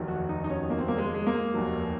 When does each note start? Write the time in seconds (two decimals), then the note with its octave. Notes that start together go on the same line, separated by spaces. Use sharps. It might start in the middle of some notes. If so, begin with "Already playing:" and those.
Already playing: F1 D#2 D#3 F#3
0.08 F#4
0.29 D#4
0.44 D#4
0.50 C#4
0.70 A#3
0.79 C4
0.88 A#3
0.98 G#3
1.14 G#3
1.27 A#3
1.54 F1 D#2 D#3 F#3